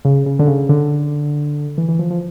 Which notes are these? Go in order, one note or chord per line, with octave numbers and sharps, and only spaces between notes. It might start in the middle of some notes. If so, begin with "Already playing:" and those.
C#3
C#3
D3
C#3
D3
E3
E3
F3
F3